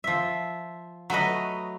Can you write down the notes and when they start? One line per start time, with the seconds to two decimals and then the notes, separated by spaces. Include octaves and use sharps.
0.04 F3 E5
1.10 F#3 A3 B4 D#5